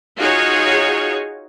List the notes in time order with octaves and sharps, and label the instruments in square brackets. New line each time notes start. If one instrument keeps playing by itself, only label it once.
[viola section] D#4 F4 F#4 G#4 C#5